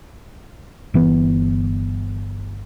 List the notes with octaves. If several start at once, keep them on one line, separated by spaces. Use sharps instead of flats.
G1 E3 B3